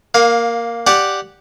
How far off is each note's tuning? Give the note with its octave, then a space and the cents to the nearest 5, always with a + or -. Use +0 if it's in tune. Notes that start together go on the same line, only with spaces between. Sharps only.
A#3 +0 F5 +25
G4 +0 D5 +0 F#5 +0